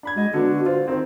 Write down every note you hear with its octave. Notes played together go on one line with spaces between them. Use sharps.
D4 B5 G#6
G#3 F#4 D#5
D3 B3 D4 F#4
F4 C5
D#3 C4